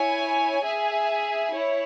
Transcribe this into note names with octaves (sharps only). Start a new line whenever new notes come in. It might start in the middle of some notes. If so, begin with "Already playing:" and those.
Already playing: E4 C#5 G#5
G#4 E5 G#5
E4 C#5